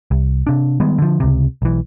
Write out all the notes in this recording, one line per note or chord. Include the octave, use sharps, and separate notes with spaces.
C2
C3 D4
D#3 G3 G#3 B3
D3 F3
C#2 C3
B1 E3